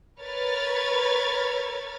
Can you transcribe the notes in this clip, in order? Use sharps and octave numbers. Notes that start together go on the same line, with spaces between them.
A#4 B4 C#5 F6 G#6 A6